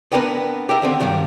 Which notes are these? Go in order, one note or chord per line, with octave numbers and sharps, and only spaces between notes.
B3 C4 D4 G4 A#4 B4
G4 A#4 E5
D#2 D3 C4
G2 A#2 D#3 F#3 G3